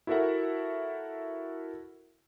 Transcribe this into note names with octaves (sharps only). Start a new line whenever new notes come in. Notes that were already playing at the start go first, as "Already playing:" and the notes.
E4 F#4 A4 A#4 E5 F#5